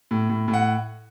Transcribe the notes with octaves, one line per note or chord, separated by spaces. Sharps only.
A2
A2
A2
F#5